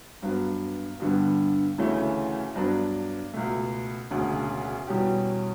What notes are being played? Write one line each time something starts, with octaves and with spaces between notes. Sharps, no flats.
G2 F#3 B3
G2 D3 G3 B3
D2 C#3 E3 A3 C#4
G2 F#3 B3 D4
C#2 B2 A3
E1 D2 C#3
E2 B2 G3 C#4 G4